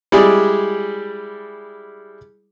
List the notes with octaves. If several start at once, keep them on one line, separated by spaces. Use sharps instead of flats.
G3 G#3 E4 G4 G#4 D5